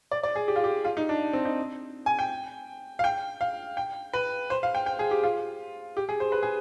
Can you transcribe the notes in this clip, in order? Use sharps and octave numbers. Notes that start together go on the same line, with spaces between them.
D5
D5
G#4
G4
F4
G4
F4
D#4
D4
C4
D#4
G#5
G5
F5
G5
F5
G5
B4
C5
F5
G5
G5
G#4
G4
F4
G4
G#4
C5
B4
G#4